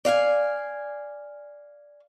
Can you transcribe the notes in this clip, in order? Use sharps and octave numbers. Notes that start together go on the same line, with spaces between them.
D5 F5 F#5 G#5